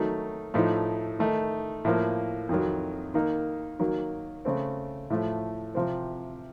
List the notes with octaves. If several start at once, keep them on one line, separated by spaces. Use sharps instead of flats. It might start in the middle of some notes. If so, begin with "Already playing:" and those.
Already playing: D#3 F#3 A3 D#4
A2 F3 A3 D#4
D#3 A3 D#4
A2 F3 A#3
F2 D#3 F#3
D#3 A#3 D#4
D#3 F#3 A#3
C#3 A3 C4
A2 F3 A3
C3 F3 C4